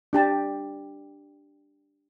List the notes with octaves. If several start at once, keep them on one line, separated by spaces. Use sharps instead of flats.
D4 G4 A5